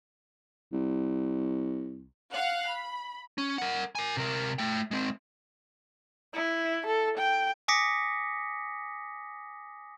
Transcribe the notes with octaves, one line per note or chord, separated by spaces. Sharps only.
C2
F5 F#5 F#6
B5
C#4
A#4 F#5
A#4 G#5
C3 A#4
A3 G5
G#3 C4
E4
A4
G5
G#5 D6 D#6 A#6 B6 C#7